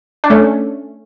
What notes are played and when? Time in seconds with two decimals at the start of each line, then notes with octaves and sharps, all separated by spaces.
0.24 D4
0.30 A3 C#4